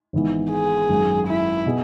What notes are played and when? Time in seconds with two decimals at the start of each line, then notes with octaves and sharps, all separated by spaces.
0.13 G#1 G#2 E3 B3
0.51 G#4
0.90 G#1 F#2 F#3
1.28 E4
1.66 B2 B3 G#4